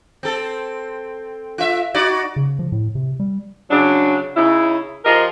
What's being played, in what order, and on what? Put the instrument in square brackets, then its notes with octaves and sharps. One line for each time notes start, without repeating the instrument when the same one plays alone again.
[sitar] C4 A4
F4 E5
D#4 F#4 D5
[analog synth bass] C#3
F3
A2
C3
G3
[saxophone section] C#3 F#3 D4
C#3 D#4 E4
F3 F4 G4 G#4 A#4 D#5